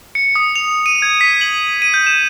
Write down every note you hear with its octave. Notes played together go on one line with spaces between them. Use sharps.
C#7
D#6
F7
D#7
G#6
B6
F#7
D#7
G6
E7